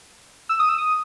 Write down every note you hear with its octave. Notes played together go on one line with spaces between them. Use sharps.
E6
D#6
E6
D#6